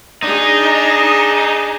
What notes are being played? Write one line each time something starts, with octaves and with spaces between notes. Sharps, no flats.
D4 D#4 G#4